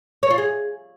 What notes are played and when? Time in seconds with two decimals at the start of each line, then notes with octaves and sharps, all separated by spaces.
0.23 C#5
0.30 F4
0.38 G#4